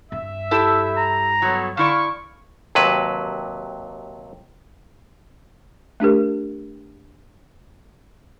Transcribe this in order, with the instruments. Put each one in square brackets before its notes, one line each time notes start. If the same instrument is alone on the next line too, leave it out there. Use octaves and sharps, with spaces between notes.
[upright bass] G2 [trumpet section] E5
[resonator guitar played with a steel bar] E4 G4 A4 [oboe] E6
[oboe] A#5
[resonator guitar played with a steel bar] F#3 [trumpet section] B3 A4 C#5
[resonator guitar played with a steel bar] D3 E4 D5 [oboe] F5 [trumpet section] C#6
[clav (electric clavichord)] D#2 C3 F#3 B4
[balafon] A3 D4 G4 A#4